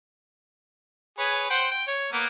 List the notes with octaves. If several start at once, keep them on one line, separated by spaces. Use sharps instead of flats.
G#4 B4 C#5
C5 F#5 G5
G5
C#5
A#3 B3